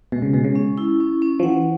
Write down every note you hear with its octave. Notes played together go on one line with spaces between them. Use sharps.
B2 G#3
C#3
B2 G#3
C#3
C#4
E4
C#4
C#4
F3
E3 F#5